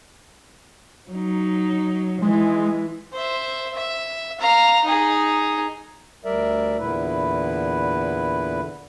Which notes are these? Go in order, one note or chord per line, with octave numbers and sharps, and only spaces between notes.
F#3 D#4
E3 G#3
C5 E5
E5
F5 A#5
D#4 G#4
D2 G3 A#4 D5 E5
E2 A#2 D3 E4 B4